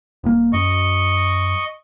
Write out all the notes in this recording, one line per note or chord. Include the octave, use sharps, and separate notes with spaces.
D#1 A#3
F#2 D#5 C#6